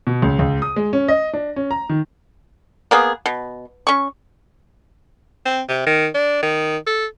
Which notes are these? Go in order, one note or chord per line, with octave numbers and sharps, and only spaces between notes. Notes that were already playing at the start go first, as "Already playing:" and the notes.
B2
C#2
C#2
D#6
G#3
C#4
D#5
D4
C#4
A#5
D#3
A#3 B3 G#4
B2
C#4 C#6
C4
C3
D#3
D4
D#3
A4